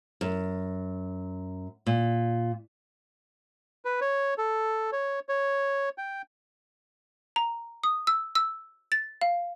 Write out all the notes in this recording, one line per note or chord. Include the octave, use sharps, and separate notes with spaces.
F#2
A#2
B4
C#5
A4
C#5
C#5
G5
A#5
D#6
E6
E6
A6
F5